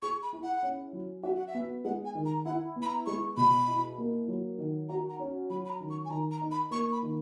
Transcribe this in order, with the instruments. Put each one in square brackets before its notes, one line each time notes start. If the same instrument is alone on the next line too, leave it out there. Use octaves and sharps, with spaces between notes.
[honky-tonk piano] G#4 [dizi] C#6
[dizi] B5
[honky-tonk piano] E4
[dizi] F#5
[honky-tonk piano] C#4
F#3
[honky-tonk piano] F#4 [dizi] E5
[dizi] F#5
E5
[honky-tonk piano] B3
[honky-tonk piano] G#3 [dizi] F#5
[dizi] G#5
[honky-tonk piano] D#3
[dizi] A#5
[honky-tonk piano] E4 [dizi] F#5
[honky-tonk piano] B3
[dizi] B5
A#5
[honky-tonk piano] G#3 [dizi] C#6
[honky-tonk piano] B2 [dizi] B5
[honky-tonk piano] E4
A#3
F#3
D#3
[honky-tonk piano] F#4 [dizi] A#5
[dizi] A#5
[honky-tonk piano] C#4
[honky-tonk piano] F#3 [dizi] B5
[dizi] B5
A#5
[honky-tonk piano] D#3
[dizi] C#6
G#5
[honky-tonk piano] D#3 [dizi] A#5
[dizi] A#5
[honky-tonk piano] D#4
[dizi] B5
[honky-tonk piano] A#3 [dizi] C#6
[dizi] B5
[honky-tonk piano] D#3